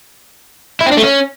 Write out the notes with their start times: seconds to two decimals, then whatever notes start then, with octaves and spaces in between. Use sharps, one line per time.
0.81 E4
0.86 C4
0.92 D4
0.97 A3
1.03 C#4